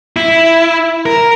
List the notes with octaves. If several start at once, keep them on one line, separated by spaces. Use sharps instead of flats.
E4
A#4